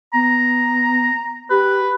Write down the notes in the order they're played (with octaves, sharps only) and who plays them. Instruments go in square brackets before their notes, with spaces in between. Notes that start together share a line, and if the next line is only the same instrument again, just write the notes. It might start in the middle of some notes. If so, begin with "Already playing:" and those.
[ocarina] B3 [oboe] A#5
[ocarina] G4 [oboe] B4